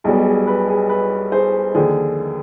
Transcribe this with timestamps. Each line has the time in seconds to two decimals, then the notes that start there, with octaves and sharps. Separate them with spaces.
0.04 B1 B2 G3 G#4
0.26 G#4
0.47 B4
0.68 G#4
0.89 B4
1.32 G#4 C5
1.74 D#2 D3 F3 G#4